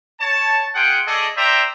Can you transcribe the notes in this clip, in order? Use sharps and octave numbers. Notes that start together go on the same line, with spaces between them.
C#5 A5
F4 G#4 F#5 G5
A3 G#4 A4 D5 D#5
C5 D5 E5 G5 A#5